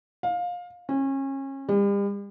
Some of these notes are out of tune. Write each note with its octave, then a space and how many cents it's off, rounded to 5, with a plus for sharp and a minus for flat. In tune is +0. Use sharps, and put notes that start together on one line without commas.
F5 +20
C#4 -30
G3 +40